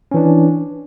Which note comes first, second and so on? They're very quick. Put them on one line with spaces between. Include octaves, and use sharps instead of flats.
C#4 E3 D4